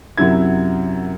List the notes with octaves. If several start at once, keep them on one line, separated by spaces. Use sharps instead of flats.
F#2 C3 F#3 E4 G#6